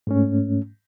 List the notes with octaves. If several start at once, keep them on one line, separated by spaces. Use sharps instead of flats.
G#2 A3 C#4